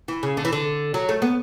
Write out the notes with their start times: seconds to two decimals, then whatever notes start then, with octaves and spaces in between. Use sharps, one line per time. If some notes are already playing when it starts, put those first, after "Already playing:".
0.08 E3
0.23 C#3
0.37 D3
0.45 E3
0.53 D3
0.94 F#3
1.09 A3
1.22 B3